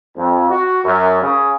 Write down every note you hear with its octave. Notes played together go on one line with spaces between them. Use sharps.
F2
F#4
F#2
C#3